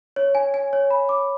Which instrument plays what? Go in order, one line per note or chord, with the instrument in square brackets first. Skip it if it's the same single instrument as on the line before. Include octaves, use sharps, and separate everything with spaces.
[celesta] C#5
G#5
G#5
C#5
B5
D6